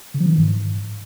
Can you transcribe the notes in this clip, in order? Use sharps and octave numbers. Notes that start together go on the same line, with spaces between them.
C#3
F3
D#3
E3
G#2